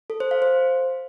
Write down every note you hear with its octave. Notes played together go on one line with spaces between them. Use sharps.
A4
C5
F5
C5